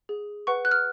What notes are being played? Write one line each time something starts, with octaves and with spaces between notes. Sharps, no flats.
G#4
B4 F#5 C#6
F#6
F6